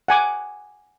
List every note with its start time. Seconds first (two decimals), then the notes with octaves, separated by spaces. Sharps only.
0.08 F#5 G#5 D6